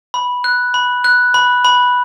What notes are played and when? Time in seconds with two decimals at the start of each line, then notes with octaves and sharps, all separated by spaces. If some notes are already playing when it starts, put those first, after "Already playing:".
0.14 B5
0.44 F#6
0.74 B5
1.04 F#6
1.34 B5
1.65 B5